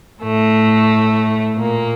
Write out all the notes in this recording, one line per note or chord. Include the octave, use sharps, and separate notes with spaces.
A2 A3
A#2 A#3